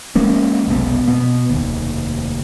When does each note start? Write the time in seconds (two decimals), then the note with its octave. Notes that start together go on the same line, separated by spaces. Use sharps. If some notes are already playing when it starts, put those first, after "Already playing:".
0.15 F3 G#3 A#3 C#4
0.68 F1 B1 A2 B3
1.08 B2 B3
1.49 F1 D#2